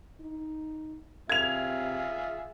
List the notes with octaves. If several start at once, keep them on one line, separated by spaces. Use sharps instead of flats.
D#4
C3 F4 G#4 E5 G#6 F7